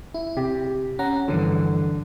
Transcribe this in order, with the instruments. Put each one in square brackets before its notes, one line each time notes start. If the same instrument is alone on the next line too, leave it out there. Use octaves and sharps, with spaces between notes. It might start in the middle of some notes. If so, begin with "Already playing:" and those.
[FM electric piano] E4
[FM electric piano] C3 [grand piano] G4
[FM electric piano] C#4 F#5 A#5
[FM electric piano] G2 E3 F3 [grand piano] D3